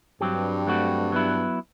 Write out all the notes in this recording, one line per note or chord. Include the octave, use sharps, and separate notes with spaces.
G2 F#3 C4 G4
F#3 A3 C4 F#4
F#3 B3 E4